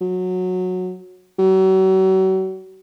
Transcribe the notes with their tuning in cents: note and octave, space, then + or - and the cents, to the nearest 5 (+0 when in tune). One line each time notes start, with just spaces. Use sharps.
F#3 -15
F#3 +40